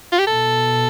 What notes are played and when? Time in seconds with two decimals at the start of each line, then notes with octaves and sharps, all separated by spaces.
0.12 F4
0.19 G4
0.27 B2 A4